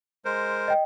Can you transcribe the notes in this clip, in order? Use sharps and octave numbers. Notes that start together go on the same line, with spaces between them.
G#3 A#4 C5
D#5 G5